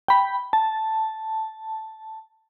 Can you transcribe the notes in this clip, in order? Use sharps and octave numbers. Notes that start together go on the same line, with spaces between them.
G5 B5
A5